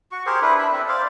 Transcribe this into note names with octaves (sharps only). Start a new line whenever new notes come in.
F#4 C#6
G4 G#4 A#4 C5
D4 E4 B4
D4 E5 B5
C4 A4
C5 D5 F5